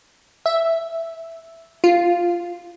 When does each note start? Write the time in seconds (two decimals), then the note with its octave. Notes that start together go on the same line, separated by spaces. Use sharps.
0.46 E5
1.84 F4